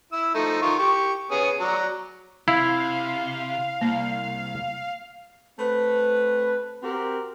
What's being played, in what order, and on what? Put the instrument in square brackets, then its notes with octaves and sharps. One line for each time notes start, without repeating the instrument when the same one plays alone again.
[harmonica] E4 E6
F3 A3 D#4
D#3 F4 C#6
G4 C#6
B3 C#4 G#4
F#3 D5 A#5
[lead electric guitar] C3 [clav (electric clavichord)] E4 [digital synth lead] F5
[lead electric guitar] C2 [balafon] A#3
[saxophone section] A3 C4 B4
C4 F#4 G4 A#4